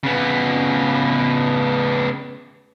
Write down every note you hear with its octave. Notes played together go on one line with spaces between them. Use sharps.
C#3 B3